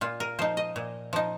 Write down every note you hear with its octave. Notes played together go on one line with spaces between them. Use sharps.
A#2 F4
A#4
F3 D#4 C5
D#5
A#2
F3 D#4